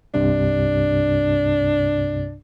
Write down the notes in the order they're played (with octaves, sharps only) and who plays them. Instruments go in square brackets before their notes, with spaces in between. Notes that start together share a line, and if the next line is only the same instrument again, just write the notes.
[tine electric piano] C2 G2 C3 [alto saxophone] D4